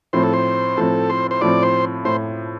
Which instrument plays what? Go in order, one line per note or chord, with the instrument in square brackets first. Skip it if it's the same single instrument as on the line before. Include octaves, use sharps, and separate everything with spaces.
[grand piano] A2 F3 C4 [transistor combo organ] C5
[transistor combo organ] A4
C5
[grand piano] A2 F3 C4 [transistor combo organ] A4
[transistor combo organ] C5
C5
[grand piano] A2 F3 C4 [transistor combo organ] D5
[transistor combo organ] C5
[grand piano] A2 [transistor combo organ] C5